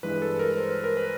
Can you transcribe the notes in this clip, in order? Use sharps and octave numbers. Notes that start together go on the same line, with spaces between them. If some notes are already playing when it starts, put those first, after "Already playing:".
G2 E3 G#3 B4
A4
A#4
C5
B4
A#4
B4